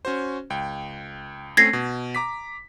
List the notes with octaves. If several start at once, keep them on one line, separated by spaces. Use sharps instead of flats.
C#4 F#4 C5
C#2 G5
A3 C4 C#4 G#6 A#6 C7
B2
A#5 D6 B6